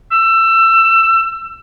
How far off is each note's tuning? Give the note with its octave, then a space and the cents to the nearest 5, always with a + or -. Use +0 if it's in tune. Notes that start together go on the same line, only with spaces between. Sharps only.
E6 +25